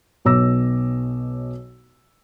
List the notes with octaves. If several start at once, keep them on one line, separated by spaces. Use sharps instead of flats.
B1 B2 C#5 D6 E6 A#6